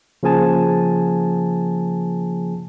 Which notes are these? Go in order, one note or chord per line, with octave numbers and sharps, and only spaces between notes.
C#3 F3 A#3 G#4 G#5 A5